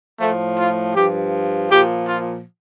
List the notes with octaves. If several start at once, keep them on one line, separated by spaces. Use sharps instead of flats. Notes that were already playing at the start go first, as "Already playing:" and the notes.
A2 F3 A3
F4
G2 F3 G4
A#2 F3 G4
F4